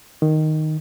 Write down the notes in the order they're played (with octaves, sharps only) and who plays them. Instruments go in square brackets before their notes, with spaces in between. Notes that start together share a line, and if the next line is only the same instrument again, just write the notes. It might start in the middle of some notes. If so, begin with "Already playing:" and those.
[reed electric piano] D#3